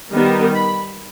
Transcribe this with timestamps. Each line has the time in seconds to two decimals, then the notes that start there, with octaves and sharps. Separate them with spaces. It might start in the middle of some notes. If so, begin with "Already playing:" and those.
0.12 D#3 G3 B3 D#4
0.55 B5